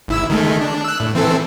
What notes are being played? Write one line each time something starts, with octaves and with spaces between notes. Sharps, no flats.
G#1 E4 E6
D#3 G#3 A3
D4
E6 F#6
A2
E3 C4 A4